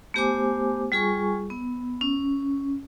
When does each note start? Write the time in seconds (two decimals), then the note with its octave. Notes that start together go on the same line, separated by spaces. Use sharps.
0.14 A3 B3 G4 C5 G#5 D6
0.92 G3 F4 G#4 G#5 C#6
1.50 B3
2.01 C#4